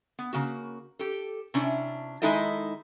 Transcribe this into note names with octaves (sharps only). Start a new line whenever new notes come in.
B3
C#3 A#3 F#4
G4 A4
C3 C#4 D4 E4
D#3 G#3 D#4 E4 A4 D#5